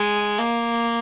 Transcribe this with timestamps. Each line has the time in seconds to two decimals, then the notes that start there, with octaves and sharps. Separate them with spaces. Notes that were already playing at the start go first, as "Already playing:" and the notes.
Already playing: G#3
0.39 A#3